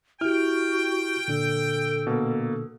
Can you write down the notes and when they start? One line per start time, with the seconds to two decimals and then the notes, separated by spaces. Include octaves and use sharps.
0.21 E4 F#4 G4 G5 F6
1.28 A#2 D3 D4 A4
2.07 B2 A#3